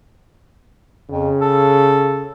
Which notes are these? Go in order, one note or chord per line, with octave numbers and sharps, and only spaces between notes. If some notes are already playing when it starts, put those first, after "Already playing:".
F2 C#3
A4